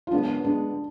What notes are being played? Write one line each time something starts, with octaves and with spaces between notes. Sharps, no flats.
F4
F#2 C#3 G#3 B3 D4
D3 G#3 B3 D4